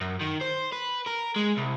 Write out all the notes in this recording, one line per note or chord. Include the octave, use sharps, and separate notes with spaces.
F#2
D#3
C5
B4
A#4
G#3
C2